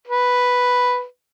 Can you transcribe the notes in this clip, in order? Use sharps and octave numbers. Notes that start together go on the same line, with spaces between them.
B4